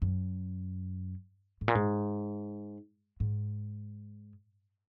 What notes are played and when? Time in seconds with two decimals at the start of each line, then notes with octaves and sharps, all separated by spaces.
0.02 F#2
1.61 G#2
1.68 A#2
1.75 G#2
3.20 G#2